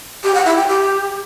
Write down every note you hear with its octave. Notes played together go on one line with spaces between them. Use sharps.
G4
F#5
E4
G5
G4